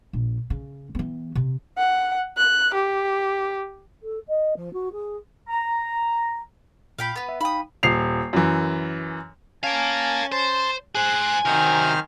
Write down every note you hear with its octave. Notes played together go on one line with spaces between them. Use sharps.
A#1
C#3
E3 B3
C3
F#5
F#6
G4
A4
D#5
F3
F#4
G#4
A#5
A#2 F5 G5 B5
B3 B4 B5
E5
D#4 F5 G5 B5 D#6
D#1 C7 F7
F#2 E3
C#4 A#4 F5 G#5 A5
C5 A5 C6
G#4 C5 G#5 F#6
C3 D#3 F#3 C5 F6